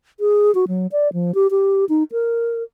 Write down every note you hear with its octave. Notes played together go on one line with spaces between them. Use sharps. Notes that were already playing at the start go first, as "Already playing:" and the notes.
G#4
F#4
F#3
D5
F3
G4
G4
D#4
A#4